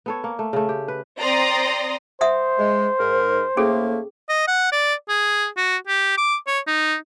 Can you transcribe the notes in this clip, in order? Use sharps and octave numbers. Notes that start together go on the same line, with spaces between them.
B3 A4 C#5
A#3
A3
C#3 A3
G4
B4
C4 D5 A#5 C6 D#6
C5 E5 F#5 D#6
G#3
G#2 A#4
A2 A3 A#3 C#4 G#4 A4
D#5
F#5
D5
G#4
F#4
G4
D6
C#5
D#4